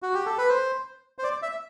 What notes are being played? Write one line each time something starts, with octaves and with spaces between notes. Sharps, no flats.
F#4
G4
A4
B4
C5
C5
D5
E5